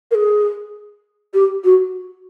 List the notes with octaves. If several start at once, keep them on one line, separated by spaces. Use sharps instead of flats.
A#4
G#4
G4
F#4